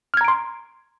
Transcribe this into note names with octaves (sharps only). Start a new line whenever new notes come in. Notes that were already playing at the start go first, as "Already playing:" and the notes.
A#5 C6 F6 G#6 D7